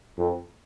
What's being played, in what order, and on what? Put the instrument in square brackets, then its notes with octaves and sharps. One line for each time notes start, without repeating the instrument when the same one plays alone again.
[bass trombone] F2